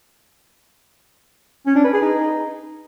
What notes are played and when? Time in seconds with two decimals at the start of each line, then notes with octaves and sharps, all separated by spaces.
1.66 C#4
1.75 D4
1.84 B4
1.93 G#4
2.02 D#4